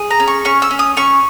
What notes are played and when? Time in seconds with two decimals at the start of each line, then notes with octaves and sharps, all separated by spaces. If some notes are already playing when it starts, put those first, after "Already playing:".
Already playing: G#4
0.11 A#5
0.20 C#4
0.28 C#6
0.45 C#4 C#6
0.62 E6
0.71 C#4
0.79 D#6
0.97 C#4 C#6